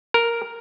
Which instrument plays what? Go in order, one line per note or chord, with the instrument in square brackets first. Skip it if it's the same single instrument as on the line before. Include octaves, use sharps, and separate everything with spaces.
[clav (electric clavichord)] A#4